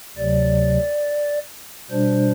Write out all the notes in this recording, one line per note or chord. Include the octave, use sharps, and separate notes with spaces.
D2 C3 F#3 D5
B2 G3 D4 C5